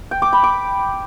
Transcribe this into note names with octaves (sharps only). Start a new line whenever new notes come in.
G5
D6
B5
D6